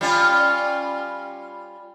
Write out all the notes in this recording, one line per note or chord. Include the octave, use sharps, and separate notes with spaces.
G3 C#4 F4